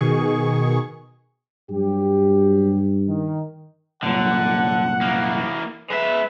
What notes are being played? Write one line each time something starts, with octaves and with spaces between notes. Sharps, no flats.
B2 D#3 G#4 C#6
G2 F#3 G4
D#3
C2 F#2 A#2 D3 F#5
E3 A#3
G#3 B4 E5